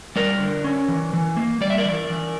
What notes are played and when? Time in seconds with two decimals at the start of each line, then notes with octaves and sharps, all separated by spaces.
0.16 G3 A#4 D5
0.40 D3
0.64 C#4
0.88 E3
1.13 E3
1.37 A#3
1.61 G3 D5
1.70 E5
1.78 A#4 D5
1.85 E3
2.09 E3